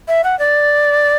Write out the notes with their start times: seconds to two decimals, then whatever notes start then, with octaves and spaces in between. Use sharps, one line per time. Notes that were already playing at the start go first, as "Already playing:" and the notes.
0.08 E5
0.24 F#5
0.39 D5